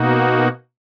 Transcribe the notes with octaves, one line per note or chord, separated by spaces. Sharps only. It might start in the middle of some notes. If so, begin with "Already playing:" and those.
Already playing: B2 A#3 D#4 F#4